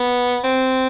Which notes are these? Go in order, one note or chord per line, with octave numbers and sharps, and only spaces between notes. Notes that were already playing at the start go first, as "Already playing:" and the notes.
Already playing: B3
C4